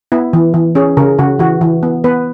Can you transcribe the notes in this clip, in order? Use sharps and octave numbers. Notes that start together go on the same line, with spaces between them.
B3 E4
E3
E3
C#4 G#4
C#3 A#4
C#3 F#4
E3 F#4
E3
B3
B3 B4